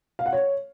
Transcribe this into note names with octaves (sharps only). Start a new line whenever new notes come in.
F5
F#5
C#5